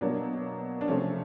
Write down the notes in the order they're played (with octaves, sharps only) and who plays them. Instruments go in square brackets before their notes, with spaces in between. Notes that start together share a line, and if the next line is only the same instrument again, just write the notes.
[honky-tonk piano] B2 F#3 A#3 D4
D4
C3 F3 A3 C4 C#4